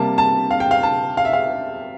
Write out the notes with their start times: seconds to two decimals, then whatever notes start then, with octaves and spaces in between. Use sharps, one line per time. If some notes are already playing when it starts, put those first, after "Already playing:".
Already playing: C3 G3 A#3 A5
0.18 A5
0.51 F5
0.60 G5
0.71 F5
0.83 A5
1.17 F5
1.25 E5
1.33 F5